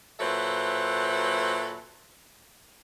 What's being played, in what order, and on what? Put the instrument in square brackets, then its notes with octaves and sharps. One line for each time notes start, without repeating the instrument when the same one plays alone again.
[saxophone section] A#2 F#3 A4 B4 C5 E5